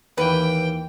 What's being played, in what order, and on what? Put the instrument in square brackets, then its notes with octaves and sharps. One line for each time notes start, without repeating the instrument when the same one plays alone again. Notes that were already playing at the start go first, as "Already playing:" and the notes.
[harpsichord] D#2 E3 [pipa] B4 [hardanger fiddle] G5